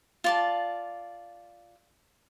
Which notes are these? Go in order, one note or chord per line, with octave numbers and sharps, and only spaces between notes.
F4 D5 A5